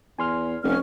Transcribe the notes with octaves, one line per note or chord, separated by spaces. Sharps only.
E2 G#5 C6 F6
F1 C#4 F6